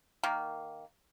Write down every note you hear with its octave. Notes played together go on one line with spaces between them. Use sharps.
D#3 A#3